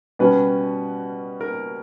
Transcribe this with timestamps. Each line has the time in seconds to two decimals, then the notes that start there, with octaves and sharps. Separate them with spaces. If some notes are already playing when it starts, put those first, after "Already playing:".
0.19 B2 G3 C#4 B4
1.41 A#4